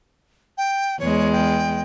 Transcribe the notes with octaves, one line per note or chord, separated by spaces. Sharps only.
G5
E2 G#3 C#5
G5